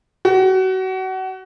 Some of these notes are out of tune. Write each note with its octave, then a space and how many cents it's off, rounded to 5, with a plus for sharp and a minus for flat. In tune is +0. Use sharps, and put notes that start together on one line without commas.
F#4 +30